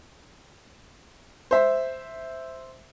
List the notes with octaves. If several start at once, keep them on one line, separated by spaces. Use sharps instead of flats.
C5 E5